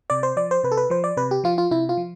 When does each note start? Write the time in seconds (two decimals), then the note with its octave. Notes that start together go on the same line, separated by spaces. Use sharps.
0.10 C3 D5
0.23 C5
0.36 F3 D5
0.51 C5
0.64 C3 B4
0.72 A4
0.77 B4
0.90 F3 C5
1.04 D5
1.17 C3 B4
1.31 G4
1.44 F3 F4
1.58 F4
1.71 C3 E4
1.89 F4
1.97 F3